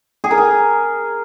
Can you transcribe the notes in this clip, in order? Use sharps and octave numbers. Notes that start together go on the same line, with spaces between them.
G#4
A#4
G#5